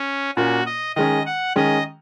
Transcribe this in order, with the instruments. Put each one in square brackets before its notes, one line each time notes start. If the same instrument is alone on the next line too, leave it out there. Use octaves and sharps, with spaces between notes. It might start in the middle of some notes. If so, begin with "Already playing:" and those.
Already playing: [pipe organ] C#4
[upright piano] A#2 A#3 C#4 [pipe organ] F#4
[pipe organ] D#5
[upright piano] D#3 G#3 C#4 [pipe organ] D#5
[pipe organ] F#5
[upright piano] D#3 G#3 C#4 [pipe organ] D#5